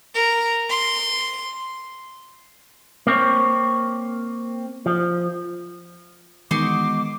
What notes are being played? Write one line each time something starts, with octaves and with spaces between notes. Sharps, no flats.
A#4
C6
A#3 C4 C#5
F3
D#3 E3 G#3 B3 D#4 F#4 C6 D6